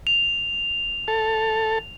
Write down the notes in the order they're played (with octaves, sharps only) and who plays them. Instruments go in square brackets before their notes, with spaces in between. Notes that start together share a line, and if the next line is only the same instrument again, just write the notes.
[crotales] F7
[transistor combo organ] A4